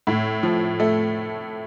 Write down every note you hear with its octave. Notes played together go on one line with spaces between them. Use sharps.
A2
F3
A3